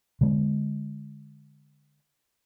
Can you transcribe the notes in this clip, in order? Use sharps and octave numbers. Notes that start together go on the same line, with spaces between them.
D3 G#3 B3